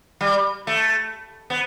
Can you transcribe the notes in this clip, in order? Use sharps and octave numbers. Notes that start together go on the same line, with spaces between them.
G3
A3
B3